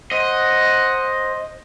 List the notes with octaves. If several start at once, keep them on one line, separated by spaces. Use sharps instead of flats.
C5 D#5 F#5